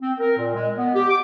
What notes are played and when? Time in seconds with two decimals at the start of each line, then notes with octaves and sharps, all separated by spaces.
0.03 C4
0.19 A#4
0.38 A#2
0.55 G#3
0.78 B3
0.95 G4
1.10 D6